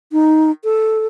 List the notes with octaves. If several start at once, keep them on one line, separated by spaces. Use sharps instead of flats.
D#4
A4